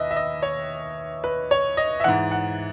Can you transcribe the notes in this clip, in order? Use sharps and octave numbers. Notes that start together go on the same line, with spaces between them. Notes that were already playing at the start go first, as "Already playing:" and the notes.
Already playing: D#2 B4 D#5 E5
E5
D#5
C#5
B4
C#5
D#5
E5
G#2 E3 F#5
F#5